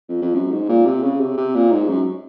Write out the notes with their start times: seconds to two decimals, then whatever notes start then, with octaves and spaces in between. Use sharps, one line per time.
0.09 F2
0.22 F2
0.35 F#2
0.51 G#2
0.69 A#2
0.86 C3
1.03 C#3
1.20 C3
1.37 C3
1.55 A#2
1.72 G#2
1.89 F#2